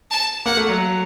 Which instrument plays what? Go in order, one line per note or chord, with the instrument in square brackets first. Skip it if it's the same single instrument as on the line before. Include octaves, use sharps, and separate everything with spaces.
[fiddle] A5
[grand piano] A#3 [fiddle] F#5
[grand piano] A3
F#3